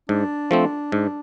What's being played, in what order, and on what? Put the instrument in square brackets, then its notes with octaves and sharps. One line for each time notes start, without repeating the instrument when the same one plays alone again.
[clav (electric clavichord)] G#2 [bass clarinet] D4
[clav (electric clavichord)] F3 A3 C4
G#2